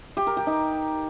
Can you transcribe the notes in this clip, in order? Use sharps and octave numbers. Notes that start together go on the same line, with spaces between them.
G4
A#4
G4
D#4